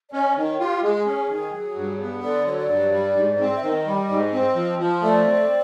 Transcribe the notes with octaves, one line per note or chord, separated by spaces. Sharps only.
D5
C#4 D#5
D#3 C#5
F4 G4
G#3 G#4
C#4
D#3
F#3
G2
B3
D3 D5
F#3 C#5
D5
G2
G3
G#2
C4
E5
D#3 D#5
G3
G#2
C4
F3
F3
A3 D5
C4